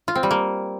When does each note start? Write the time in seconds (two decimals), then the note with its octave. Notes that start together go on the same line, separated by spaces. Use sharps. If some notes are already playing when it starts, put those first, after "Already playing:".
0.08 F4
0.15 C4
0.23 G3
0.31 A#3